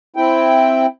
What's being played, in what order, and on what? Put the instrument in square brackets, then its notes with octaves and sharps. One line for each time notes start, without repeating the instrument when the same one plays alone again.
[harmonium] C4 E4 G5